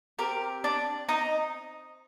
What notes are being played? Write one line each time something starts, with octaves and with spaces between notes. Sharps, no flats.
C4 G4 A#4
D4 D5
D#4 D#5